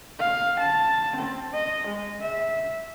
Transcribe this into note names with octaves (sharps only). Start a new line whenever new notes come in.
F5
A5
C4
D#5
G#3
E5